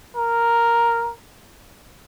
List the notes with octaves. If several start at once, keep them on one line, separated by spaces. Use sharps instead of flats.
A#4